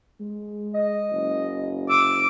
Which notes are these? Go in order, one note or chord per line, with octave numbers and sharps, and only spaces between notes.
G#3
D#5
F#1
D6 E6